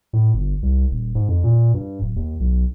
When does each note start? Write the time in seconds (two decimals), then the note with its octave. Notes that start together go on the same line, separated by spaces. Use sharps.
0.13 A2
0.34 G1
0.62 C2
0.91 D#1
1.15 G#2
1.29 F2
1.44 A#2
1.74 G2
2.01 D1
2.16 D#2
2.40 B1